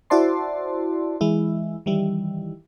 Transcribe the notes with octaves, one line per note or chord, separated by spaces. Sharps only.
E4 F#4 C5 D5 A5 C6
E3 G#3 E4
D#3 E3 G3 E4